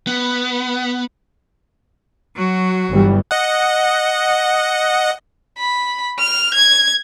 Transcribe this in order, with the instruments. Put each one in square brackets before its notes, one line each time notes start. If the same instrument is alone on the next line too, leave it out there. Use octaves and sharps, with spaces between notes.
[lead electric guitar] B3
[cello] F#3 F#4
[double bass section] G1 E3 G3
[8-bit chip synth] D#5 F#5
[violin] B5
F6
G#6